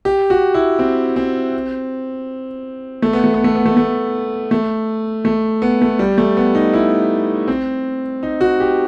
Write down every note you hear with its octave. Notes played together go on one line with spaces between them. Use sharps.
G4
F#4
E4
C4
C4
A3
B3
A3
B3
A3
B3
A3
A3
A3
A3
B3
A3
G3
A3
B3
D#4
E4
C4
D#4
F#4
G4